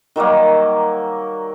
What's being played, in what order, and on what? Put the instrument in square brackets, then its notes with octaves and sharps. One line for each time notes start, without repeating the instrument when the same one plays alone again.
[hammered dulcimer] D#3 F#3 G3 A#3